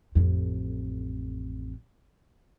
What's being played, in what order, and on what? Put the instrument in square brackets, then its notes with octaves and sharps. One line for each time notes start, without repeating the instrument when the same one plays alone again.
[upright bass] A1 F2